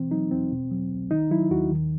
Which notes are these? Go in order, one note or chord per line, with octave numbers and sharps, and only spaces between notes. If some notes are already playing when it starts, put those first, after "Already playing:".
Already playing: B2 E3 C4
F#3 D#4
E2 C4
B2
F#3
C2
D#3 D#4
F#3 E4
D#2 F#4
D#3